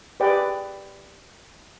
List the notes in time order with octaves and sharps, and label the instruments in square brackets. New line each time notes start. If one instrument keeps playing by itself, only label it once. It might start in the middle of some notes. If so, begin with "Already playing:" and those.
[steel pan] G4 G#4 B4 D5 G5